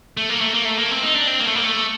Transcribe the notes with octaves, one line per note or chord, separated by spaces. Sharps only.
A3
A#3
A3
A#3
A3
A#3
C4
D#4
D4
C4
A#3
A3
A#3
A3